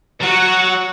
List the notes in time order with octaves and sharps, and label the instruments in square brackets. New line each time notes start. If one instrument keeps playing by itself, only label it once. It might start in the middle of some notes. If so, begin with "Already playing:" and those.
[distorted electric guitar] F#3 [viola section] F#4 F#5